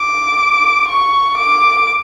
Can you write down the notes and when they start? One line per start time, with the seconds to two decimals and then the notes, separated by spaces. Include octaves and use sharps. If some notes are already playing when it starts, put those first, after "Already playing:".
Already playing: D6
0.88 C#6
1.37 D6